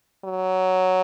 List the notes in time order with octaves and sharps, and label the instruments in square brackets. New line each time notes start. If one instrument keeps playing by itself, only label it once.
[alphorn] F#3